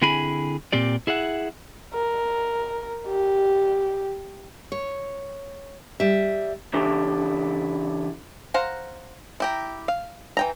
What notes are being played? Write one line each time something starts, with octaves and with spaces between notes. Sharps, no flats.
D3 C4 E4 G#4 G#5 B5
A#2 C4 G4 D5
E4 G#4 E5 F#5
A#4
G4
C#5
G3 E5
C#3 E3 D4 E4 G4 A4
C5 F5 F#5 A#5
E4 G4 A#5
F5
E3 G5 A#5